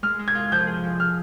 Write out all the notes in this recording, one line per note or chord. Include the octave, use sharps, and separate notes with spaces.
G#3 F6
G#3
G#6
F4
F3 G6
G#4
F3
F6